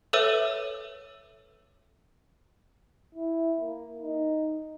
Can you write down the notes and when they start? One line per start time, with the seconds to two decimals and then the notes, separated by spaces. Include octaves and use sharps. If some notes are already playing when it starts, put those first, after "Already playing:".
0.13 A4 B4 C#5 E5 E6 D#7
3.15 E4
3.59 A#3
4.02 D#4